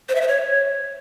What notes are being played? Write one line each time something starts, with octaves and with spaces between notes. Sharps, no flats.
C5
E5
C5
C#5